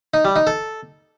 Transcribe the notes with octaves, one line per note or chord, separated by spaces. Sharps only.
D#4
G3
D#4
A4